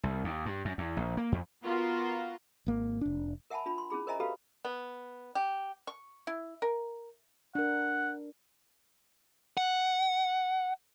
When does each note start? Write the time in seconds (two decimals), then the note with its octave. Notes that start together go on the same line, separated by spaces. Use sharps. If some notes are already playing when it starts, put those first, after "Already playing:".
0.03 C2
0.24 D#2
0.46 G2
0.65 F#2
0.78 E2
0.97 A#1
1.17 A#3
1.32 F2
1.63 B3 F4 F#4 A#4
2.66 G#1 A#3
3.01 F1 D4
3.50 A#4 E5 F#5 G#5 A5 B5
3.66 D4 F4 B5
3.78 C6
3.90 C#4 E4 G#4 B5
4.07 A#4 C5 D#5 E5 G#5 A#5
4.20 F#4 G4 A4 B4 F5 B5
4.65 B3
5.35 G4
5.87 C#6
6.27 E4
6.62 A#4
7.55 D4 A#4 F#5
9.57 F#5